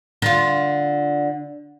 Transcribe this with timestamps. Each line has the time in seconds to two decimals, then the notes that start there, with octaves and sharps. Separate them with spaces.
0.22 D3 F4